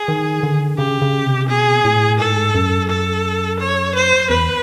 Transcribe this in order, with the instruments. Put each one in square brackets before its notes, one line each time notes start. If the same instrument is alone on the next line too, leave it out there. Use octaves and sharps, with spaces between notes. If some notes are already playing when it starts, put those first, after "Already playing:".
Already playing: [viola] G#4
[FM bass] D#3
D3
[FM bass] C#3 [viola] G4
[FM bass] C#3
C3
[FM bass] B2 [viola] G#4
[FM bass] A2
[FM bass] G#2 [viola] A4
[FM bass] F#2
[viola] A4
C#5
C5
[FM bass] E2 [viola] B4